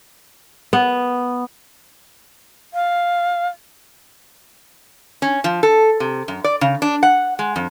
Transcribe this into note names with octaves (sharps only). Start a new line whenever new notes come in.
B3
F5
C#4
F3
A4
C3
F#2
D5
C#3
D4
F#5
G#3
F2